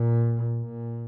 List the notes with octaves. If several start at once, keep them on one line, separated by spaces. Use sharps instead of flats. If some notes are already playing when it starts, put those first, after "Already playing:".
Already playing: A#2
A#2